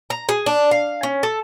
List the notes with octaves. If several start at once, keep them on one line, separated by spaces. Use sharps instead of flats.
A#5
G#4
D4
F5
C#4
A4